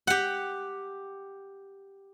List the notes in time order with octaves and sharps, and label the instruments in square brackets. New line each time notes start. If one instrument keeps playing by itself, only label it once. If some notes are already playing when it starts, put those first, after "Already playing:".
[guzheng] G4 F#5